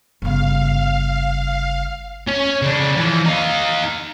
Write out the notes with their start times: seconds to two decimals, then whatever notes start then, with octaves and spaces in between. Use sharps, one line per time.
0.22 G1 C#3 F5
2.27 C#4 C#5
2.62 C#3 D4
2.97 E3 F3
3.25 D#4 F5